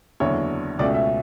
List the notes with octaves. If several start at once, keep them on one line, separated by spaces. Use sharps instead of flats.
F#1 E2 D3 F#3 C#5
C#2 B2 A3 C#4 D5
E5